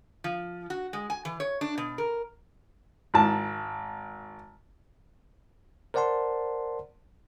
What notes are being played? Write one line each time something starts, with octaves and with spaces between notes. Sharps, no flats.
F3
F#4
G#3
G#5
E3
C#5
D4
B2
A#4
G#1 A5
A#4 C5 D5 F#5 A5 C6